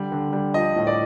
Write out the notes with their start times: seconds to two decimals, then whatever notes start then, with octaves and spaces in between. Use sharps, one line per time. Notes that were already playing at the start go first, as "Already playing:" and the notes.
Already playing: D3 G3
0.12 D3
0.33 G3
0.54 F3 D#5
0.76 A2
0.87 D5